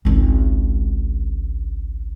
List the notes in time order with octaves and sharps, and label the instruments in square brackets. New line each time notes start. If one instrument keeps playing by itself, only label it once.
[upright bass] G#1 C#2